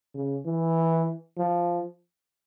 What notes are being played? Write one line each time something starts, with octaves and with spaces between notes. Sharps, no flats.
C#3
E3
F3